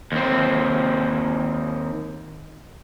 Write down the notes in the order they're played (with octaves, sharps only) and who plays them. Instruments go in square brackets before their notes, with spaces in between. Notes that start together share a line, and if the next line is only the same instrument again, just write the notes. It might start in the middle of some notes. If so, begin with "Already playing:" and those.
[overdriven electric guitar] D#2 C4